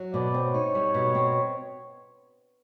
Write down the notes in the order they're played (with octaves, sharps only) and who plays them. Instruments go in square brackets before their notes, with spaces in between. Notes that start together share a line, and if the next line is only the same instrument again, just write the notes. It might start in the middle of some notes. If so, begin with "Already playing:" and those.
Already playing: [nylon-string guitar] F#3
[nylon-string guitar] B2 [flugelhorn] D5
[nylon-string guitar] C4
[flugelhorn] C#5
[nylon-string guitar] D#4
G3
B2
C4